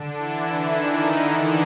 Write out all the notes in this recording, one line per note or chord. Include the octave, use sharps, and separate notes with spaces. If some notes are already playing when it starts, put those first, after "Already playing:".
Already playing: D3 D4
E3 E4
D#3 D#4